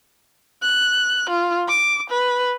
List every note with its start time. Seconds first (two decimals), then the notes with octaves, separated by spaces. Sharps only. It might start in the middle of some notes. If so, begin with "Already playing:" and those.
0.62 F#6
1.30 F4
1.68 D6
2.10 B4